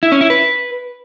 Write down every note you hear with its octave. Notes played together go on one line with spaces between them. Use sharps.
E4
C#4
E4
B4